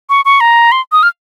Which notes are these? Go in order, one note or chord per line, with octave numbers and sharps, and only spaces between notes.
C#6
C#6
A#5
C6
D#6
F6